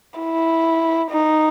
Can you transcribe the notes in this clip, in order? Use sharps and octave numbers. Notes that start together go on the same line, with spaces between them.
E4
D#4